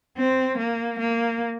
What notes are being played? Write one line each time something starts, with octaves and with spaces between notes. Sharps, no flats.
C4
A#3
A#3